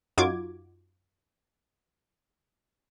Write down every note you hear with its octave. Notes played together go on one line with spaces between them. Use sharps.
F#2 D#4 F4 F#4 D6 G#6